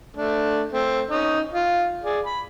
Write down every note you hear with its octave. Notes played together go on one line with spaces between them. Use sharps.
A3 D4
A3 C4
C#4 D#4
F4
G#4 D5
B5